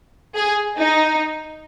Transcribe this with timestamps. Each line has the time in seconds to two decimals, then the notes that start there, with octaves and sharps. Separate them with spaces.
0.36 G#4
0.79 D#4